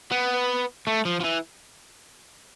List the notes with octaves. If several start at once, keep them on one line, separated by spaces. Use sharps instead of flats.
B3
A3
F3
F3
E3